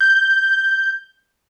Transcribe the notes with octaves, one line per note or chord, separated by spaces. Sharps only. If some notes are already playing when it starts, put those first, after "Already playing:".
G6